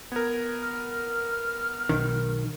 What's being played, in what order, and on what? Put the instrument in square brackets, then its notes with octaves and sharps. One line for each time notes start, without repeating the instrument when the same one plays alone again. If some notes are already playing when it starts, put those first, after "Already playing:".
[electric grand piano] B3 A#4 [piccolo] G#6
[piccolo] F6
[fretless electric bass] B1 [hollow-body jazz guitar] D#3